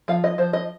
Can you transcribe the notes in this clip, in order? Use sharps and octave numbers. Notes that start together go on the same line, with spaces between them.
F3 F5
D#5
F3 C5
D#5